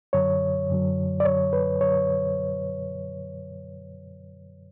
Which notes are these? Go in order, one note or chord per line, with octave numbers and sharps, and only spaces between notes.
F#2 D3 F#3 C#5
F#2 D3 F#3
D5
F#2 D3 F#3 C#5
B4
F#2 D3 F#3 C#5